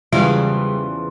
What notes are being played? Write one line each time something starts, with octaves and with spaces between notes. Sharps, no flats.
E2 C#3 E3 F3 G3 G#3